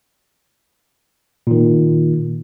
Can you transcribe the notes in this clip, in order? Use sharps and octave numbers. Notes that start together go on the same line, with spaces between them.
A#2 D#3